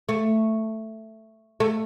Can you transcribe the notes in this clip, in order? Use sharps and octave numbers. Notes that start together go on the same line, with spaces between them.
A3
A3